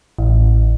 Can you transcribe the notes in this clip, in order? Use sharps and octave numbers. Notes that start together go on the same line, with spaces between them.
A1